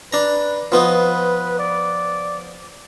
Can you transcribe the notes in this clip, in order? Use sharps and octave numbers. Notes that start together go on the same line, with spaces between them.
D4 B4 A#5
F3 B3 D#4 B4
D5